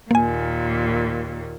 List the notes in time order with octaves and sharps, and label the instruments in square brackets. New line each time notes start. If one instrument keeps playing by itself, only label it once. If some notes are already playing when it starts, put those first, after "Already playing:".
[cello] D#2 A#2 [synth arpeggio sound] A#3 G#5